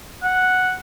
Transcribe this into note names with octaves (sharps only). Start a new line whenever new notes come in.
F#5